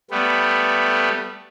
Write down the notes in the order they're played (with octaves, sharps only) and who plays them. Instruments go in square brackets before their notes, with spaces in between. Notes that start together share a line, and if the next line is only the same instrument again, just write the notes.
[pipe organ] G3 A3 B3